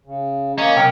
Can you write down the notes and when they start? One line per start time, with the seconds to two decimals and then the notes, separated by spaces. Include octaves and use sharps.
0.05 C#3
0.58 A#3 C#4 D#5 A#5
0.76 B1 C3 A#4 G5